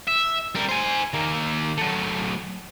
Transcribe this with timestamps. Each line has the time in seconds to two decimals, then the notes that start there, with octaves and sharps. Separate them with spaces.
0.07 E5
0.55 G3 A#4
0.69 C5 G#5
1.13 D#3 A#3
1.77 F#3 A3